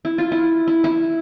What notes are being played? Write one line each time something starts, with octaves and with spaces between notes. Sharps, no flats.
E4
F4
E4
E4
E4